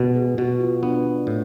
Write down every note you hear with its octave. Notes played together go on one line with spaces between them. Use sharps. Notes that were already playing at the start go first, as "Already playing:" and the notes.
Already playing: B2
G#4
B2 F#4
F4
B3 D4
A2